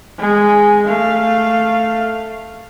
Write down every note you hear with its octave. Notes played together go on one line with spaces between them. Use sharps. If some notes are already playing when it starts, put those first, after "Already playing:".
G#3 G#5
A3 F5